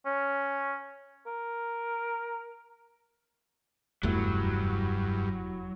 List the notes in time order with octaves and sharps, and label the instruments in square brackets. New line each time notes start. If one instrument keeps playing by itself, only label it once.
[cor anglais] C#4
A#4
[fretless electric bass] F1 E2 A3 [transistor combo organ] G2 [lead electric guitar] F#3 [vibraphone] E4 F#4 B5